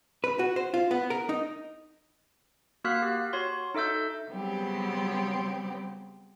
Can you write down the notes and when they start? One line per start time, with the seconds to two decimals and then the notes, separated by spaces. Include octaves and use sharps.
0.24 B4
0.39 F#4
0.56 C5
0.74 F4
0.91 B3
1.10 A#4
1.29 D#4
2.84 A#3 F#4 F5 F6 F#6 B6
3.02 G4
3.33 F#4 C#5 C6
3.74 D#4 A4 E5 E6 G6
4.30 C#3 F#3 G3 B3 C4 G4